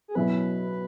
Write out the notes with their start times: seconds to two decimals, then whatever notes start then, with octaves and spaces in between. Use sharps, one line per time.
0.08 G#4
0.15 B2 F#3 C#4 E4 B4